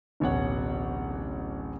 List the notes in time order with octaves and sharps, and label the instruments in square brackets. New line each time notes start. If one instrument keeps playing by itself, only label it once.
[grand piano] D1 A1 B2 C#5 F#5